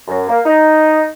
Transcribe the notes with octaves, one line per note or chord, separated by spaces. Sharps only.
F#2
A#3
D#4